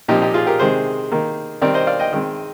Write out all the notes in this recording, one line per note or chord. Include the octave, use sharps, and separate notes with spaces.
A#2 F3 C4 D#4 G4
D#4 G4
F4 G#4
G4 A#4
C3 D#3 G#3 G#4 C5
D#3 A#3
D#3 G3 C4 A#4 D5
C5 D#5
D5 F5
D#5 G5
D#3 G#3 C4